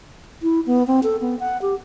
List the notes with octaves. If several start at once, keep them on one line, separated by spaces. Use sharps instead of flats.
E4
B3
C4
A4
B3
F#5
G4